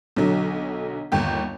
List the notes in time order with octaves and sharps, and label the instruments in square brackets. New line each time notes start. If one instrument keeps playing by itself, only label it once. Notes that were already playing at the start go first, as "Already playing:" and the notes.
[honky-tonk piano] B1 D3 F#3
G1 D#2 G5